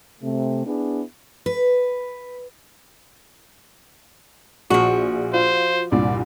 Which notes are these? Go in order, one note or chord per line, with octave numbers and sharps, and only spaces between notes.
C3 A3
B3 D4 E4 G#4
B4
A#1 F3 F#4
F4 C5
C2 G2 A#2 D5